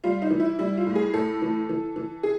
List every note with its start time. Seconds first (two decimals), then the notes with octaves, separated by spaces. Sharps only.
0.04 G3 F4
0.22 D#4
0.30 E3
0.40 E4
0.59 G3 E4
0.77 F4
0.87 A2
0.95 G#4
1.14 A2 A4
1.42 E3
1.69 E3
1.96 E3
2.23 G#4